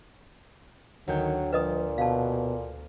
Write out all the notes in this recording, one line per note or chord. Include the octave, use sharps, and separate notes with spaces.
D2 D#3 F#3 G4 G5
A#2 F3 B4 D#5 D#6
B2 F5 A5